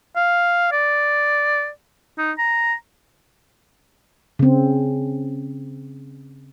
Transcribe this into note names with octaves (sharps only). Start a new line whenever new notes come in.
F5
D5
D#4
A#5
C#3 C4